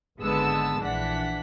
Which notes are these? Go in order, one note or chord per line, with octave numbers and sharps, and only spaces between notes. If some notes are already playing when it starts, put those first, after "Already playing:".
G#1 D3 G#3 B3 A5 E6
A#1 E3 D4 F#5 B6